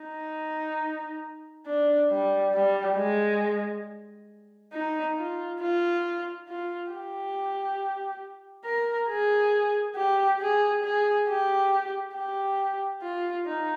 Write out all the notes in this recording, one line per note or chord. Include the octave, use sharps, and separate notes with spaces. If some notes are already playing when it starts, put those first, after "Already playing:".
Already playing: D#4
D4
G3
G3
G#3
D#4
F4
F4
F4
G4
A#4
G#4
G4
G#4
G#4
G4
G4
F4
D#4